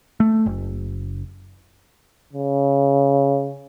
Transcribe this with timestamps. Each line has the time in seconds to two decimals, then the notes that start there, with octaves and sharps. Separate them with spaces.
0.20 A3
0.46 F#1
2.33 C#3